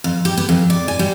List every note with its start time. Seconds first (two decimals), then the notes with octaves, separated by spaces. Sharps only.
0.04 F2
0.25 G4
0.37 B3
0.49 F2
0.70 D5
0.88 G#5
0.99 G3